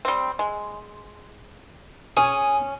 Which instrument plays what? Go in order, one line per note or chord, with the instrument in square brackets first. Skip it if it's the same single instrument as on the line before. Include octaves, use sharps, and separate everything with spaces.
[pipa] G3 C4
G#3
[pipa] C#4 [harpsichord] G#4